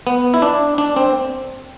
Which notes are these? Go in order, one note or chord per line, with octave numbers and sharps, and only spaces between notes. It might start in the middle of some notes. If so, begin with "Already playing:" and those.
B3
E4
D4
D4
C4